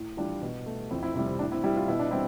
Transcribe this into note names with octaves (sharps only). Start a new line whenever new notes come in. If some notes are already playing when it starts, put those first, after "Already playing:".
Already playing: A2
E3 G3 D4 F4
B2
A3
F2 C4 E4
C4 E4
C3 G3 C4
C4
A2 D4
C4 E4
G3 E4 G4
F4
B2 E4
D4
G3 C4 E4